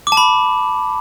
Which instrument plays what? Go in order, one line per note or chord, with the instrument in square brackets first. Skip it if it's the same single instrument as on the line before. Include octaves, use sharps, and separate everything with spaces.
[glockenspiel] D6
A5
B5